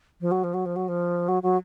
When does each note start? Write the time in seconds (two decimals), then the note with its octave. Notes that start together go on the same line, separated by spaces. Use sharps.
0.21 F3
0.31 F#3
0.44 F3
0.54 F#3
0.66 F3
0.76 F#3
0.88 F3
1.28 F#3
1.43 F#3